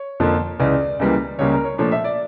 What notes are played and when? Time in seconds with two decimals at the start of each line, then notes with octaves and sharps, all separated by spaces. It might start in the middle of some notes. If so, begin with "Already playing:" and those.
Already playing: C#5
0.20 F2 D3 F3 A#3
0.59 C#2 C#3 E3 D5
0.99 C#2 C#3 E3 G3 A#3
1.39 C#2 C#3 G3 A#3 C#5
1.52 A#4
1.65 C#5
1.78 A#2 F3 A3 D4 C#5
1.92 E5
2.04 D5